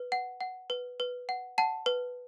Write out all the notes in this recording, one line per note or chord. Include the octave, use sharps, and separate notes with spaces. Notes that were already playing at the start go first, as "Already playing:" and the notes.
Already playing: B4
F#5
F#5
B4
B4
F#5
F#5 A5
B4